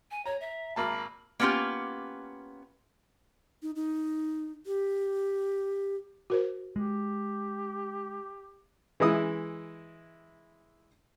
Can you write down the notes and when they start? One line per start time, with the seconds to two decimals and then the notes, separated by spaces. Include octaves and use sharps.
0.11 G#5
0.26 C#5 A#5
0.41 E5
0.76 G#1 A#3 A5 B5
1.40 A#3 B3 C#4 F4 G4
3.63 D#4
3.76 D#4
4.66 G4
6.30 F#4 A#4 C5
6.76 G#3 G4
9.00 E3 G#3 E4 D#6